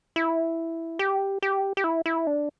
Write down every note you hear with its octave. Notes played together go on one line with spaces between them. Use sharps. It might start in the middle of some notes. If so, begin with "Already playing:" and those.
E4
G4
G4
G4
E4
E4
D4